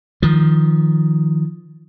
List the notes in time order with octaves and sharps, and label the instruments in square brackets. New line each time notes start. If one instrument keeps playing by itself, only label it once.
[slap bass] D#3 F3